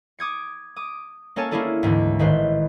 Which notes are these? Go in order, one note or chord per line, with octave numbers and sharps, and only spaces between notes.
D6 D#6 G#6 C#7
D6 D#6
A#3 C#4 A4 C#5 G#5 A5
A#3 C#4 D4 E4 G#4 A4
D2 G#2 D3 E3
A1 D#3 B4 C5